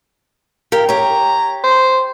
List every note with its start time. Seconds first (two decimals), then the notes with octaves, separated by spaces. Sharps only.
0.72 G4 A#4 F5
0.89 G4 C#5 A#5
1.64 C5